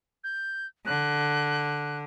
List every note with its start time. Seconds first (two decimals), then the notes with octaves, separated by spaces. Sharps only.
0.24 G6
0.86 D3 F#6